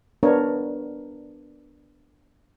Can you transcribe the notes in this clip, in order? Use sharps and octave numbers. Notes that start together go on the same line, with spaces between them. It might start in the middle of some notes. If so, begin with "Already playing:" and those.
B3 D4 A#4 C#5